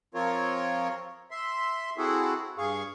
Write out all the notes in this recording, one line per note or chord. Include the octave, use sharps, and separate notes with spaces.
F3 C4 F4 A#4 C#5
E5 C6
C4 E4 F#4 G#4 A4
G2 G#4 F5 C#6